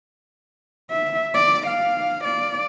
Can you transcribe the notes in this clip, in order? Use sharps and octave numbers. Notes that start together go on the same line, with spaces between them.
E5
D5
F5
D5